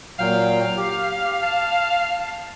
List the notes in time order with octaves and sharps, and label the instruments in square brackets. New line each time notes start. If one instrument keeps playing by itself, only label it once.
[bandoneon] A#2 F#3 G5 [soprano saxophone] F5
[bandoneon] G4
A5